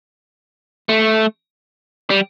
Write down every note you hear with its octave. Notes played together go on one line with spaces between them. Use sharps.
A3
G3